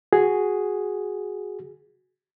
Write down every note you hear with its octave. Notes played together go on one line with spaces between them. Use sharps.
F#4 G#4